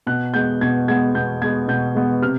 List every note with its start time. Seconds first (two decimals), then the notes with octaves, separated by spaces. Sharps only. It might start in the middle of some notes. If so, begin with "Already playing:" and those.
0.07 B2 F#6
0.34 G#3 B3 G6
0.61 B2 G#6
0.88 G#3 B3 G#6
1.15 B2 G6
1.41 G#3 B3 G#6
1.68 B2 G6
1.95 G#3 B3
2.22 C3 F6